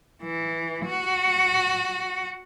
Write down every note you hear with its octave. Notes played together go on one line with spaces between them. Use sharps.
E3
F#4